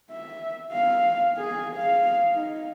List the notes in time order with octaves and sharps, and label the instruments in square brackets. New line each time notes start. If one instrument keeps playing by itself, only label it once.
[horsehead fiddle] E5
F5
G#4
F5
D#4